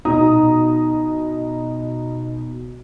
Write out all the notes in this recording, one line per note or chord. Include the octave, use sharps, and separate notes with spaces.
B2 D#4 A#5 D#6